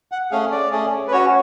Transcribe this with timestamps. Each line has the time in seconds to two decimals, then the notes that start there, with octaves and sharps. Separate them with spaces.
0.12 F#5
0.31 A3 C#4 G#4 F5
0.51 D5
0.71 A3 C#4 G#4
1.08 B4
1.11 C#4 F#4 C#5